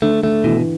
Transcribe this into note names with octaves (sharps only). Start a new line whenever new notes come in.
D3 A3
D3 A3
B2 E3